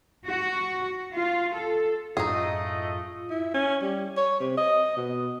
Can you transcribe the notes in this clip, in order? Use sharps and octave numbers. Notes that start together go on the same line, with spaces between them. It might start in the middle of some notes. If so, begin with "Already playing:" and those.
F#4
F4
A4
F#2 A2 A3 C#4 D#4 F4 G#4 D#5
E4
C#4
G3
C#5
C3
D#5
B2